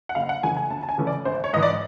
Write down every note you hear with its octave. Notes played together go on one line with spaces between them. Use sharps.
F#5
F#1 F5
F#5
F2 C#3 E3 A3 G#5
G#5
D2 A5
A5
G#5
C#3 E3 A3 C#4
D5
G#1 C5
C#5
G#2 E3 D#5
D5